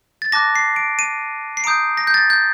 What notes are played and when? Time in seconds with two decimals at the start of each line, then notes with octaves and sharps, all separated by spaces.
0.22 A6
0.32 A5 D6 F#6 A#6
0.55 C7
0.76 D7
0.99 D#7
1.57 C7
1.64 A#5 D#6 G6 D7
1.97 A#6
2.07 G6
2.14 A6
2.30 G6